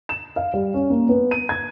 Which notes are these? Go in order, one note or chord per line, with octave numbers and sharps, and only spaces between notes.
E7
F5
G3
C#4
A#3
B3
D#7
G#6